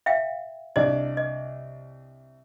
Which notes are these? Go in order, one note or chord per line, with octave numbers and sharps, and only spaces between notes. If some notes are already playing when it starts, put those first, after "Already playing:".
E5 F5 G5
C2 D4 D5 D#5
D#5